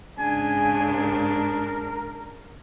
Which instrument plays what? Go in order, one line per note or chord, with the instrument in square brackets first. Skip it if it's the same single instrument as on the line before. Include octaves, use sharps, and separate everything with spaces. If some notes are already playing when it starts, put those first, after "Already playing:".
[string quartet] G#2 C#3 D4 [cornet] G#5
[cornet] A#4